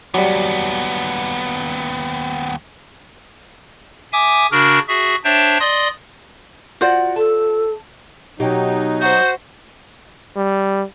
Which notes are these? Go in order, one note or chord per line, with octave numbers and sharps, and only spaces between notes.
D#2 F#3 G3 B3
E5 G#5 D6 D#6
C#3 D4 F#4 A#4 F6
F#4 G#4 E5
D4 C5 C#5 E5 G5 A5
D5 D#5 C6 D#6
F4 F#4 C5 D5
A4 A5
B2 F#3 D#4 G4
F#4 C5 G6
G3